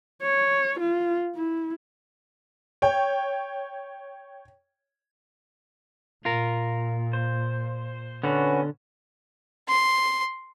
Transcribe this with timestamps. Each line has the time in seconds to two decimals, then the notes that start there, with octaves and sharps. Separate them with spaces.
0.23 C#5
0.80 F4
1.35 E4
2.82 C#5 G5
6.25 A#2 F4 A#4
7.13 C5
8.24 D3 B3 C#4 F#4
9.69 C6